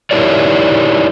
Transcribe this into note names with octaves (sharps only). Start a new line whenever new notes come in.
D#4 E4 G4 A#4 C#5 D5